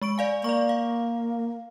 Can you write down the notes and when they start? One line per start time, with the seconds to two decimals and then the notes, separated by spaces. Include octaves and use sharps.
0.02 G#3 C#6 D7
0.18 D5 F5 G#5
0.44 A#3 D5 C#6
0.69 F5